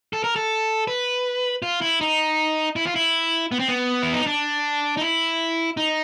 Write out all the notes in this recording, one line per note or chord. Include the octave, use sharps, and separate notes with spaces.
A4
A#4
A4
B4
F4
E4
D#4
E4
F4
E4
B3
C4
B3
E4
D#4
D4
D#4
E4
D#4